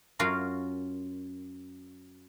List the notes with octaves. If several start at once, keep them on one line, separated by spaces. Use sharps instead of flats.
F#2 C#4 F4 F#4 A#4 F5